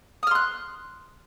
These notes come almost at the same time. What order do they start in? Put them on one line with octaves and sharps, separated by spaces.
D#6 F6 C6 F#6